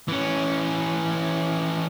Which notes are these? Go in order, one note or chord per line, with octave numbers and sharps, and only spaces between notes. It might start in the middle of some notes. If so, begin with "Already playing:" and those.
E3 C#4